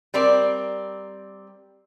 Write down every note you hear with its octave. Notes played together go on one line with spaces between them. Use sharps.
G3 C4 A#4 D5